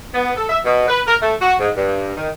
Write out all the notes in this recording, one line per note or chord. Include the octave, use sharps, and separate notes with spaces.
B3
A4
E5
B2
B4
A#4
A3
F#4
G#2
G2
D#3